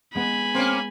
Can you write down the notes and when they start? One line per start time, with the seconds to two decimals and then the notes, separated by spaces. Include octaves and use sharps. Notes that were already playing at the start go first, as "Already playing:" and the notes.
0.15 G#3 B3 G#5 B5
0.55 A#3 C4 C#4